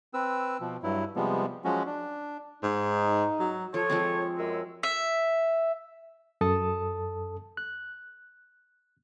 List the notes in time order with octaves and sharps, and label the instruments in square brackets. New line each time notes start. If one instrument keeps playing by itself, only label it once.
[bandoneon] C4 B4 E6
B2 F3
G2 F#3 E4
C3 F3 G3 G#3 B3
F3 F#3 G#3 C#4 F#4
D4
[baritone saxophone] G#2 [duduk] D#4
[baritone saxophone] F#3
[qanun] F3 [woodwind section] A4 C#5
[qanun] F3 G#3 C4
[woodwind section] F#2 G#3 E6
[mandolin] E5
[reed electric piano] F#2 A4 A5 D#6
F#6